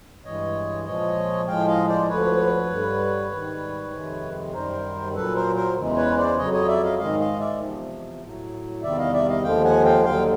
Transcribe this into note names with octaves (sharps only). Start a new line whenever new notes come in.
G2 E3 G#3 C#5 D#5
A#2 F3 G#3 C#5 D#5
A2 F3 G#3 F5 G5
D#5 F5
C5 D5
D2 D3 F3 B4 C#5
G2 D3 G3
G#2 D#3 G3
F2 C3 D#3 G#3
F#2 D#3 G3 A#4 C5
A#2 F#3 A4 B4
A#4 C5
A#4 C5
E2 C#3 E3 G#3
B4 C#5
C5 D5
F2 C#3 F#3 C#5 D#5
C#5 D#5
D5 E5
D#5 F5
G#2 D#3 G#3 D#5 F5
D#5 F5
D5 E5
E2 C3 F3
A2 F#3
E2 C3 D#3 G3 D5 E5
D#5 F5
D5 E5
D#5 F5
D#2 D3 F3 G#3 F5 G5
F#5 G#5
F5 G5
D#2 D3 F#3 F5 G5